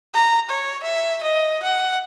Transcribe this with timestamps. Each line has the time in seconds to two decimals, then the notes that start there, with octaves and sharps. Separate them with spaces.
0.14 A#5
0.49 C#5
0.83 E5
1.23 D#5
1.63 F#5